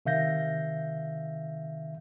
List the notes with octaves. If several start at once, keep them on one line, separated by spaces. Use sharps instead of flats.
C3 D#3 E5 F5 G6 A#6